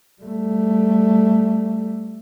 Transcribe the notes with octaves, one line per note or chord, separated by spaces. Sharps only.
G3 A3